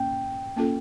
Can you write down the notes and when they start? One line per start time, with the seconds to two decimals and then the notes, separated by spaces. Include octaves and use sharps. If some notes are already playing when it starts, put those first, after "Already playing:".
Already playing: A#3 C#4 G5
0.56 A#3 C#4 F4 A4